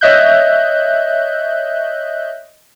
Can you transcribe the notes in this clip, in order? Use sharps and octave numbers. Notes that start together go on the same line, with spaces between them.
C#5 D#5 E5 F#6 G6